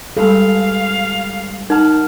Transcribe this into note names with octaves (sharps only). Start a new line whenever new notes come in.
G2 G#3 A3 A4 F5
D#4 A#4 F#5 A5 F6